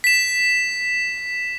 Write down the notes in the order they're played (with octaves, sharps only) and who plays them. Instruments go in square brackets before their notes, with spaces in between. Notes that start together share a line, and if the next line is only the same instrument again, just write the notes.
[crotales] B6 E7